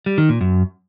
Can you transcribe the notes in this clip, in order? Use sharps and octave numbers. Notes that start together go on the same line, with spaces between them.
G3
D#3
A#2
F#2